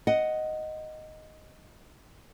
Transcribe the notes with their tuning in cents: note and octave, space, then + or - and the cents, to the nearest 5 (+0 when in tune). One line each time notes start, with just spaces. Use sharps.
D#5 +0 F#5 +5